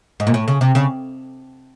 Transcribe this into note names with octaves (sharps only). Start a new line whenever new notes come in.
G#2
A#2
A2
C#3
C3
C#3